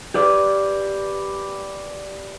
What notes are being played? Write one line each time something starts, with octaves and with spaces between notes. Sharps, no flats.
G4 B4 D5